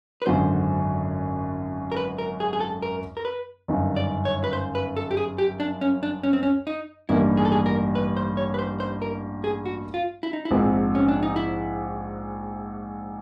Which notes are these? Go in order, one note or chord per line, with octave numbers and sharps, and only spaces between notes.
B4
G#1 F#2 D3 F#3 C5
A#4
B4
A#4
G#4
G#4
A4
A#4
A#4
B4
G1 F#2 D#3
D5
C#5
B4
C5
B4
A4
G4
G#4
G4
D4
C#4
D4
C#4
C4
C#4
D#4
A1 G2 D#3 G3 A#3 E4
G#4
A4
G#4
A#4
B4
C5
C#5
B4
C5
C5
A#4
G#4
F#4
F4
E4
D#4
E4
A#1 G#2 F3 G#3 C4
C#4
D4
D#4
E4